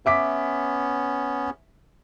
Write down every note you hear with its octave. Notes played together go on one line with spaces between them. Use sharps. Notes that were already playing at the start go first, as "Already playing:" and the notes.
B3 C#4 E5 D6 B6